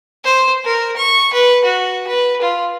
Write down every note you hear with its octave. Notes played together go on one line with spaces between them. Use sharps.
C5
A#4
C#6
B4
F#4
B4
F4